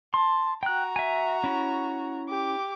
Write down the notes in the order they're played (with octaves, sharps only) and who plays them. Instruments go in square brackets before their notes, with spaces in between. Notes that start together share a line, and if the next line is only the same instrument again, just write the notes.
[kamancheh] A5 [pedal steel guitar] C6
[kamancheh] F#4 A#5 [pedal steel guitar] G5 F#6
[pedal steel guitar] E5 G#5
C#4 E4
[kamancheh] G4 D6